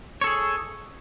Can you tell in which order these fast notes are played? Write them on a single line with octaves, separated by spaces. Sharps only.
C#5 A4 G#4